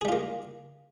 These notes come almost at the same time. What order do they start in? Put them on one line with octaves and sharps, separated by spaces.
G#4 G3 F4 A#3